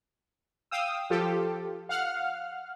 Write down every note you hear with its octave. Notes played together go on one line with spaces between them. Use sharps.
F5 G5 D#6 E6
F3 F4 G4 A4
F5 F#5 F6